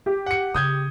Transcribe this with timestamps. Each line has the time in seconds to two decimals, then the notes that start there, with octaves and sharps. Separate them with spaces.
0.06 G4
0.26 F#5 C#7
0.54 C#3 D#6 G6 G#6